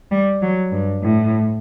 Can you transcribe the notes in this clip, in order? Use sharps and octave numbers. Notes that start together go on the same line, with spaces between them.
G3
F#3
G2
A2